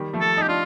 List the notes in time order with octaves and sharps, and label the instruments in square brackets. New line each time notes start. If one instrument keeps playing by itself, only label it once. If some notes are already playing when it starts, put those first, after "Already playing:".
Already playing: [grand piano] D#3 G3
F3 A3
[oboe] A4
[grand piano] D#4
[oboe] G4
[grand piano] D4 [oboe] F4